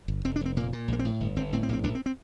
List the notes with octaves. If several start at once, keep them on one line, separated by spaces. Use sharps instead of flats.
G1
F1 C4
D4
F1 C4
A#2 A#3
A#2
A#1 A#3
C4
A2
G1
G1 C4
A2 C4
C4
A#1 A#3 C4
A#1 D4
C4
C4